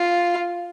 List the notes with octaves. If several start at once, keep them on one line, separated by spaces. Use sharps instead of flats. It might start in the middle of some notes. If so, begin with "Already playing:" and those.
Already playing: F4